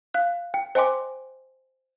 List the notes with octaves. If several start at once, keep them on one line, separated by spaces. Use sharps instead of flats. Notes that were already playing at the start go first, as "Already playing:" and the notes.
F5 F#6
G5
C5 D#5 G5 G#5 C6 D6